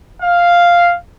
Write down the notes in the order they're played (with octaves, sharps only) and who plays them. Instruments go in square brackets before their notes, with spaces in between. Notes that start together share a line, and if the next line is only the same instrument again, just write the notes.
[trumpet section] F5